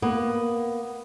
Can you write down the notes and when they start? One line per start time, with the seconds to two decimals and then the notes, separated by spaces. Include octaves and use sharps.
0.02 A#3 B3